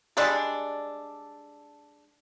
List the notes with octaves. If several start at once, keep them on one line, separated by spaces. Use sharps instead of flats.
G3 G#3 D4 A4